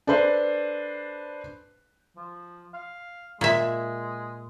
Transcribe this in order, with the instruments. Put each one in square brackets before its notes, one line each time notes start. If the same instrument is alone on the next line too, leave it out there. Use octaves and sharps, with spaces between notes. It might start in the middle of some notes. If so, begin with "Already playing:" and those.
[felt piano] D4 A4 B4 C5
[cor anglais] F3
F5
[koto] A#2 E5 [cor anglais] G#3